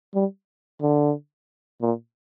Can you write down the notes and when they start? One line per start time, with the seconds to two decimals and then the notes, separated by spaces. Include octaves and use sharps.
0.15 G3
0.82 D3
1.82 A#2